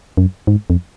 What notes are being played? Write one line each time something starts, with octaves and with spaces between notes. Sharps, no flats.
F#2
G#2
F2